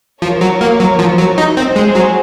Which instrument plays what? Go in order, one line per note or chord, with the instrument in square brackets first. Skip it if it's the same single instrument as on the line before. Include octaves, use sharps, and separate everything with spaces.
[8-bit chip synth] F3 [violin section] A#4 C#5
[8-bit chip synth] F#3
A#3
F#3
F3
F#3
D#4
C4
[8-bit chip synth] G#3 [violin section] G#4 C5
[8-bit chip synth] F#3